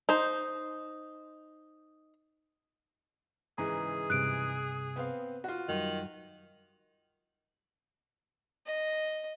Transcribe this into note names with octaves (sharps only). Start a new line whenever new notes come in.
D#4 C5
G#2 C#3 E3 G#4 A#5
G2 C3 F#6 D7
B3 C4 F5
F4 F#4
F#2 D#3 F#3 G3
D#5